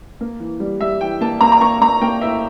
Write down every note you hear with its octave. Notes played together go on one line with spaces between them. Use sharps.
A#3
E3
G3
G3 E5
E3 G5
A#3 A5
A#3 A#5
A#5
A#3 C#6
A#3 A#5
A#3 G5
A2 E5